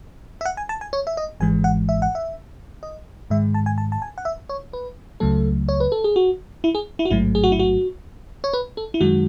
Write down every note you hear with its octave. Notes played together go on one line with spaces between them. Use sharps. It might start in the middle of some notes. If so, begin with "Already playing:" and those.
E5
F#5
G#5
A5
G#5
C#5
E5
D#5
G#1 G#2 E3 G#3 G#5
F#5
E5
F#5
E5
D#5
G#2 D#3 G#3 E5
A5
G#5
A5
A5
G#5
F#5
E5
C#5
B4
C#2 C#3 F#3 A3 A4
C#5
B4
A4
G#4
F#4
E4
G#4
E4
F#4
A1 G#2 F#3 A3 E4
G#4
F#4
E4
F#4
C#5
B4
A4
E4
F#2 D#3 G#3 F#4